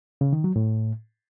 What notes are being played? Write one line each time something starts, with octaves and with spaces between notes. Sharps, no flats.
C#3
D#3
F#3
A2